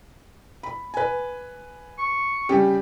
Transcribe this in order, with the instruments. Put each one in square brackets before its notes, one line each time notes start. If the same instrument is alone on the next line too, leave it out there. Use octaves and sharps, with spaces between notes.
[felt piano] B5
B4 G#5
[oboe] C#6
[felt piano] C#3 G3 G4